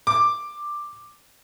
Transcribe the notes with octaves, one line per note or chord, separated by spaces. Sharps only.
D6